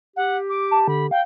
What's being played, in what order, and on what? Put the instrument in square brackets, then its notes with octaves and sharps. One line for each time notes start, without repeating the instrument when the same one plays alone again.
[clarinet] G4 [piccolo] F#5
[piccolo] D6
[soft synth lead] A5
[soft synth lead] D3 [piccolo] B5
[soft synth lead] F5 [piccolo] G5